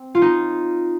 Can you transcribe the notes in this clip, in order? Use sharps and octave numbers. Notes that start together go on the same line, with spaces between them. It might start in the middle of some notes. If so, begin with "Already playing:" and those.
Already playing: C4
F4
D#4